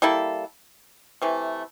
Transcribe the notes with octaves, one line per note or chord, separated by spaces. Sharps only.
G3 A#3 E4 A4
C3 E3 A3